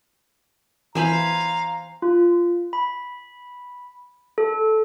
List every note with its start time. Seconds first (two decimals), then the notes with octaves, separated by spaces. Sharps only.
0.95 E3 C5 F5 G#5 A#5 B5
2.02 F4
2.73 B5
4.38 A4